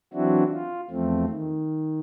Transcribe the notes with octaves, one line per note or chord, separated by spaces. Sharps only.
E3 F#3 C4 D4 E4 F#4
F4
E2 F3 A3 C4
D#3